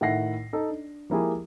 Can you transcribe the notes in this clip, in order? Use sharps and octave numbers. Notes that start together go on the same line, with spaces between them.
A2 D#3 E5 F#5 A#6 C7
D#4 A4
D4
F3 G#3 A#3 E4 G4 G#4